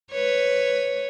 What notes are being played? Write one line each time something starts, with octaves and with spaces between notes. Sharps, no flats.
B4 C#5